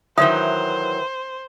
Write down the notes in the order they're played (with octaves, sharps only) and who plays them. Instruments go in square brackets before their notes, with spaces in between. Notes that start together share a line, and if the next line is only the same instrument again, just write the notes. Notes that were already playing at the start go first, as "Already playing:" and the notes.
[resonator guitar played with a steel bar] D#3 E3 F#3 [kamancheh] C5 [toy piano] E5 D#6